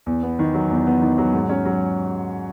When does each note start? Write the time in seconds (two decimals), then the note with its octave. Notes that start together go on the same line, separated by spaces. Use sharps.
0.06 E2
0.23 B3
0.39 D#3
0.54 F#3
0.70 E2
0.87 B3
1.02 D#3
1.18 F#3
1.33 G#2
1.49 C#4
1.65 F#3